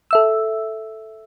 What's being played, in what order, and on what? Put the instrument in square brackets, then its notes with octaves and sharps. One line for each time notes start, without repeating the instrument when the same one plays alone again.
[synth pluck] A4 E5 E6